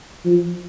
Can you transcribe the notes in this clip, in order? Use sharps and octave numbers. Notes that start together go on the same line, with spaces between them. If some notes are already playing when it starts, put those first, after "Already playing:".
F3